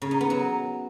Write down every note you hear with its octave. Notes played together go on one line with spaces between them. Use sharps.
C#3
D#4
B3
F#3